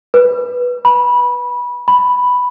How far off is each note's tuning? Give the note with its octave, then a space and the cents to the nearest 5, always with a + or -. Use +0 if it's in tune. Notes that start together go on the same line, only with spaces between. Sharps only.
B4 -5
B5 -20
B5 +0